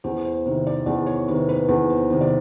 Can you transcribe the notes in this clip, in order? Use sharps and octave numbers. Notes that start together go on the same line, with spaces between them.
E2 C5
C5
C3 D#3
D5
E2 D5
C#5
C3 D#3 B4
B4
E2 B4
C5
C3 D#3
D5